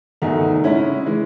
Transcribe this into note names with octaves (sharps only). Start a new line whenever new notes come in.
E2 D#3 A3 D#4 F#4
C#3 G#3 C#4 E4
E3 G#3